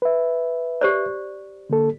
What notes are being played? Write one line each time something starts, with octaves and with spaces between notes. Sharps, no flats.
B4 E5
G4 C5 D5
D3 A#3 A4